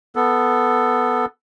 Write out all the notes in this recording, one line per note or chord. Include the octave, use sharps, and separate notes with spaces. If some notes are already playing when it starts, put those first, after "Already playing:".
B3 A4